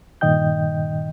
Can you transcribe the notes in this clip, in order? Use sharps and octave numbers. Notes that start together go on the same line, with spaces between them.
G2 A#2 D#3 D#5 G5 G6